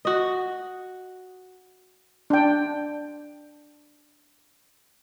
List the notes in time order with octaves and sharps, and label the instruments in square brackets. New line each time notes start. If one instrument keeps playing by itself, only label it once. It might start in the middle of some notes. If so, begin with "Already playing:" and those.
[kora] F#4 D#5
[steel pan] D4 G5